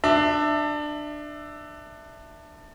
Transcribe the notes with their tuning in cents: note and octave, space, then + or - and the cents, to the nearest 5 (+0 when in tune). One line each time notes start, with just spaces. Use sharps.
D4 +20 E5 +0